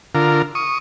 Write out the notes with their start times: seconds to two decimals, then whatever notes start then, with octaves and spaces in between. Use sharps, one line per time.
0.15 D3 F4 A#4
0.55 C#6 D#6